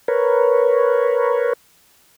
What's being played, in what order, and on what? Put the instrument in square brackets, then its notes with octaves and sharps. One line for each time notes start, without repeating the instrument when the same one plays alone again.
[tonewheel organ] A#4 B4 C#5